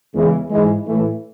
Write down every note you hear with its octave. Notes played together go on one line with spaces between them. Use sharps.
E2 C#3 E3 G#3
G#2 E3 G#3
A2 E3 A3